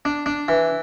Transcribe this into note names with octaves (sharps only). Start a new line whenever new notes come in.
D4
D4
E3